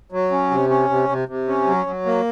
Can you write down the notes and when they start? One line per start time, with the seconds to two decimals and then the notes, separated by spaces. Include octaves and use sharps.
0.12 F#3
0.31 C#4
0.51 C3
0.70 C#4
0.90 C3
1.09 C3
1.28 C3
1.48 C#4
1.67 F#3
1.86 F#3
2.06 A#3